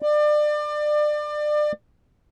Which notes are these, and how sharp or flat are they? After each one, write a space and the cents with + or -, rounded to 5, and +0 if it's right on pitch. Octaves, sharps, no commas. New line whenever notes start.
D5 +30